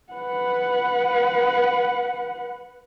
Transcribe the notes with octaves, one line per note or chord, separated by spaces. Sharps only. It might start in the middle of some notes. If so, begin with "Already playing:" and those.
B4 F#5